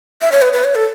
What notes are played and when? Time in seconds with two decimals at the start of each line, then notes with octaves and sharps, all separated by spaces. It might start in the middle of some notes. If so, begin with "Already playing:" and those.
0.22 E5
0.32 C#5
0.42 B4
0.53 B4
0.64 C#5
0.75 A4